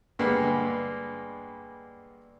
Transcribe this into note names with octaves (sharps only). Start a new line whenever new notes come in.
G2 D3 G#3 A#3 B3